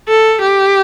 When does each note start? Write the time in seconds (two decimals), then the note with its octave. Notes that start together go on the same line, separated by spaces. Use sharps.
0.08 A4
0.41 G4